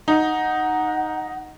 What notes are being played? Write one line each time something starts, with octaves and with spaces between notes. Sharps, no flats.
D#4 F#5